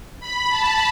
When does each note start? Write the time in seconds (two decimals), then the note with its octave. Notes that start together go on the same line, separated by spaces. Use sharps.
0.20 B5
0.49 A5